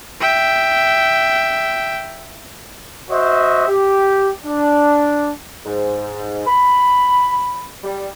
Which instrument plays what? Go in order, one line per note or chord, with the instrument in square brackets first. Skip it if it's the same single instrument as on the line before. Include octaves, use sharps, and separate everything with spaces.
[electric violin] E5 G5
[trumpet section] F#4 C5 D#5 E5
G4
D4
[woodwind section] G#2
B5
G3